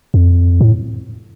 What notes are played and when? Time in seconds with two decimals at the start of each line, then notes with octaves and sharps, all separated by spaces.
0.14 F2
0.61 A2